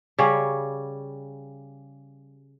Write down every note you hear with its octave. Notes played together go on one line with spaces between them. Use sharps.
C#3 G3 C#5